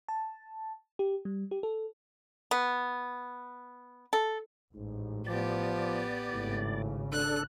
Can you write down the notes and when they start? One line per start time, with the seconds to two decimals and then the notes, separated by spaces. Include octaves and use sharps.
0.09 A5
0.99 G4
1.25 G3
1.51 G4
1.63 A4
2.51 B3
4.13 A4
4.74 A1 G#2
5.27 F3 B3 G4 D5
6.31 G#1 A2 C#3
7.12 D4 A4 F#6